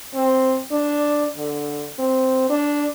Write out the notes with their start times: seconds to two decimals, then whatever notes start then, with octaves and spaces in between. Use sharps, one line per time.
0.14 C4
0.71 D4
1.37 D3
1.99 C4
2.49 D4